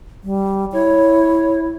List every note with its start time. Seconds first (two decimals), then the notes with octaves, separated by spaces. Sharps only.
0.24 G3
0.72 E4 C#5